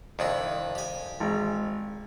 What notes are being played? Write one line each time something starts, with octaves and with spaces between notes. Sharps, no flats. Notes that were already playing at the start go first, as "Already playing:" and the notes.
C2 F2 D#3 D4 E4
G4 G#5
G#1